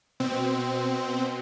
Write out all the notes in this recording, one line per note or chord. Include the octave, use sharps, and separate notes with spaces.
B2 C4